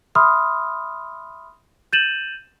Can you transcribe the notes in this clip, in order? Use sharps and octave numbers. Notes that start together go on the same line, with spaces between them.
E5 B5 C6 D#6 F6
G6 A6 D#7 E7 F#7